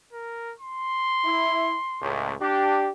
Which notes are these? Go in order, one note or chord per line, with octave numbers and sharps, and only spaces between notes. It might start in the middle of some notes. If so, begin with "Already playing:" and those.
A#4
C6
E4
C#2 A2
D4 G4